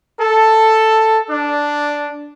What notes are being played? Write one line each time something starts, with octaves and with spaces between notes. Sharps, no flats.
A4
D4